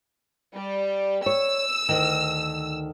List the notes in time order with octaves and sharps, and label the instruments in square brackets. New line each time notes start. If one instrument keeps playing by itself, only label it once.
[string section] G3
[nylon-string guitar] C#5 [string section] E6
[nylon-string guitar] D2 D#3